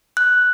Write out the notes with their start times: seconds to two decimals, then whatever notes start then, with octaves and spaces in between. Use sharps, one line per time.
0.17 F#6